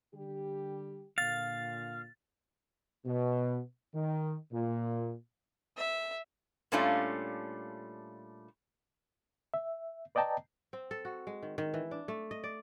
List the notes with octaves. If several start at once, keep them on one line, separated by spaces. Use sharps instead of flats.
D3 G3 G4
A#2 D3 F5 A6
B2
D#3
A#2
E5
A#2 G3 A3 C#4 D4 F4
E5
B4 D5 D#5 G5 A5 A#5
C4
A4
F#4
G#3
D#3
D#3
E3
D4
A3
D#5
D5